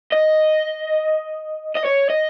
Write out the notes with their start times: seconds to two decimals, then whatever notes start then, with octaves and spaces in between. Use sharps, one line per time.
0.12 D#5
1.75 D#5
1.85 C#5
2.10 D#5